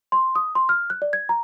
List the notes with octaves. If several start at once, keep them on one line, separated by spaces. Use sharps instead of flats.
C6
D#6
C6
F6
F#6
D5
G#6
A#5